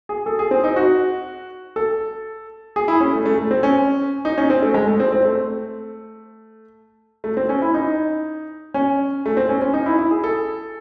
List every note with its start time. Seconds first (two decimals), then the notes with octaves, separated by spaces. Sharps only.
0.09 G#4
0.26 A4
0.39 G#4
0.51 C4
0.64 D#4
0.76 F#4
1.76 A4
2.76 G#4
2.88 E4
3.00 C#4
3.13 A3
3.26 A3
3.38 A3
3.51 C4
3.63 C#4
4.25 D#4
4.38 C#4
4.50 C4
4.62 A3
4.74 G#3
4.88 A3
5.00 C4
5.12 C4
5.25 A3
7.24 A3
7.37 C4
7.49 C#4
7.62 E4
7.74 D#4
8.74 C#4
9.26 A3
9.37 C4
9.49 C#4
9.61 C#4
9.74 D#4
9.86 E4
9.98 E4
10.11 G#4
10.24 A4